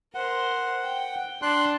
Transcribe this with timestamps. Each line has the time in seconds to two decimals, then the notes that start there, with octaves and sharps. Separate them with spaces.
0.15 A#4 C5 F#5
0.82 G5
1.42 D4 C6 F#6